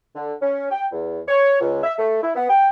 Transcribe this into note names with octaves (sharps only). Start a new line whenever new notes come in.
D3
C#4
G5
E2
C#5
C#2
E5
A3
E4
B3
G5